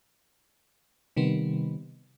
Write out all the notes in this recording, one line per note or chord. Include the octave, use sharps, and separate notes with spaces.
C3 D#3 G3 B3 C4